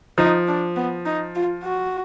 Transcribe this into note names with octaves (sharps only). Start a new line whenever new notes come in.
F3 D#4
D4
B3
D#4
F4
F#4